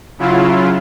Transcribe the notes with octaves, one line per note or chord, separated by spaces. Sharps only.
C#3 F#3 E4 F4